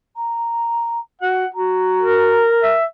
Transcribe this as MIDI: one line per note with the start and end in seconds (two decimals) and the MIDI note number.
0.16 0.99 82
1.21 1.44 66
1.21 1.47 78
1.54 2.46 66
1.54 2.50 82
2.00 2.76 70
2.63 2.85 76